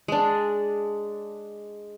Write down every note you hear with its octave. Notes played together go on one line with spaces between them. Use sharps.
G#3 D4